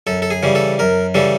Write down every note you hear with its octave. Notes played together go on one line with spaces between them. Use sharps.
F#2 A4
A4
G#4
C#3 E3 G3
A4
F#2 A#4
C#3 E3 G3 A4